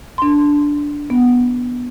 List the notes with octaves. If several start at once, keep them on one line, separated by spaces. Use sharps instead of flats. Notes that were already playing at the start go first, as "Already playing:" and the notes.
D4 C6
B3